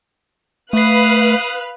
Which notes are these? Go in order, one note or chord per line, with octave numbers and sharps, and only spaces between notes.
A3 B4 F5 D#6 F#6 C7